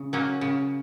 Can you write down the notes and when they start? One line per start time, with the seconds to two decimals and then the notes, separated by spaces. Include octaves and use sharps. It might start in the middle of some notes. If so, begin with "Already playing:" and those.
Already playing: C#3
0.13 F#3 A#3 C#4
0.41 C#3